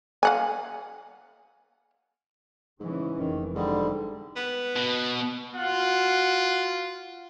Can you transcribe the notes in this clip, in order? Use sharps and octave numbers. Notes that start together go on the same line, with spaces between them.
F5 F#5 G#5
G#2 C#3 E3 C#4
F1 D#3 E3
G#2 D3 G3
B3
B2
F4 F#4 F#5